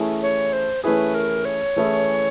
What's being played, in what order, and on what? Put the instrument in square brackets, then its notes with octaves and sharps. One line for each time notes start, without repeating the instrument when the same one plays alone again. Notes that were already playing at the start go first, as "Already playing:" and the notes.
Already playing: [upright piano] E3 A3 C#4 E4 G#4
[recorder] C#5
C5
[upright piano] E3 A3 C#4 E4 G#4 [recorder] B4
[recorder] A#4
C#5
[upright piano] E3 A3 C#4 E4 G#4